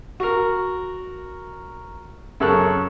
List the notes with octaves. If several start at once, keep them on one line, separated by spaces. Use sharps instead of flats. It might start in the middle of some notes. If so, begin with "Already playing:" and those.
F#4 A#4
F#2 C#3 A4 A#4 C#6 F#6